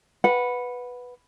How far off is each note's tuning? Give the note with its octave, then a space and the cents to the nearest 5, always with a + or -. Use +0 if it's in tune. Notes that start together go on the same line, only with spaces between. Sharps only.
B4 +0 F#5 -20